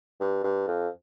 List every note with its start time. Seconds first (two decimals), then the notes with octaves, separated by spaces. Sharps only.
0.20 G2
0.44 G2
0.67 F2